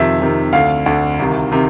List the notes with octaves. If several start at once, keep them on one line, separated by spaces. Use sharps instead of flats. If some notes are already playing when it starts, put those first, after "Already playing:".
Already playing: F2 C3 D#3 E5
F2 C3 D#3
D2 D3 F5
D2 D3
C2 C3 D#3
C3 D#3